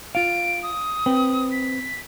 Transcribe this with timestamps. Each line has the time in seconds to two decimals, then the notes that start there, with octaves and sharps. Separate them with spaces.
0.15 F4 F5 D7
0.63 D#6
1.06 C4 B4 G5
1.52 B6